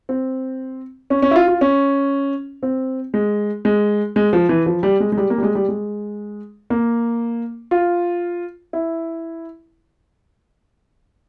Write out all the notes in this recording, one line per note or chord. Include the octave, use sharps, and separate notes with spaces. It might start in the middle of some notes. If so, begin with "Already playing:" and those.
C4
C#4
C#4
E4
F4
F4
C#4
C4
G#3
G#3
G#3
F3
E3
F3
G3
G#3
G#3
G3
A#3
G3
G#3
G3
G#3
A#3
F4
E4